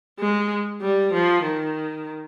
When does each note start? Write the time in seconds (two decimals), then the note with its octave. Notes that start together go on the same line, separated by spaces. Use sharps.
0.19 G#3
0.81 G3
1.13 F3
1.43 D#3